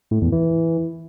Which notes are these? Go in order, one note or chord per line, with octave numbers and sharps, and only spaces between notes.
A2
E2
E3